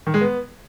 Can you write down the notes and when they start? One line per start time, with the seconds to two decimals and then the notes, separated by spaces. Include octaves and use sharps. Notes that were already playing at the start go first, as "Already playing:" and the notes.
0.07 D#3
0.14 G#3
0.21 B3